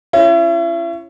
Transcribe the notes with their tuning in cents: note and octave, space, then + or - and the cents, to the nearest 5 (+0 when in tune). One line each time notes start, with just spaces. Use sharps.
C#4 -5 E4 +40